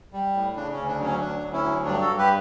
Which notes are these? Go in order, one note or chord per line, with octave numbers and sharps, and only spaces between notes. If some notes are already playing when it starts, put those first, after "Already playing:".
G3
A2
C#3 D4
D2 C#4
D4
F#3
C#4
D2 D4
D2
C#4 E4
F#3
G2 D4
F#4 A4
G2
G4 B4